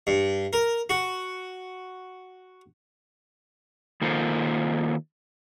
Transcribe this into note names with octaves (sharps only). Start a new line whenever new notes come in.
G2
A#4
F#4
D#3 A#3 F4 A4 C5